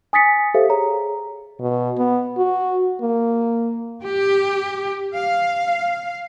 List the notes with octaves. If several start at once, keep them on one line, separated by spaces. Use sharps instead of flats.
G#5 D#6 A6 B6 C#7
G4 A4 C5 E5 F5
G#4 C#5 A#5
B2
B3
F#4
A#3
G4
F5